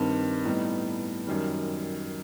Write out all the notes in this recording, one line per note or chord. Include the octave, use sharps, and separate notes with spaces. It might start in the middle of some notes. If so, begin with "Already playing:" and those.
Already playing: G2 D#3 G3 C4
A2 G3 B3 D#4
F#2 D#3 G3